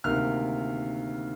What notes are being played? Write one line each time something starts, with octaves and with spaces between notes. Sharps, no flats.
D2 C3 D#3 A#3 F6